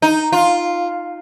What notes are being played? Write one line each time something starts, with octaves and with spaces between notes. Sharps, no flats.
D#4
F4